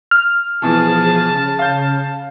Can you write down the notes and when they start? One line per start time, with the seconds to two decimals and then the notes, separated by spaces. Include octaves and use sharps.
0.11 F6
0.62 B2 E3 F3 G#4 A5
1.28 C#3
1.59 F5 G6